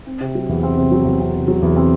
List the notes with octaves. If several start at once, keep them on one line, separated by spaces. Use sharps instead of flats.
C4
C3
F#3
E2
C4
C3
F#3
E2
C4
C3
F#3
E2
C4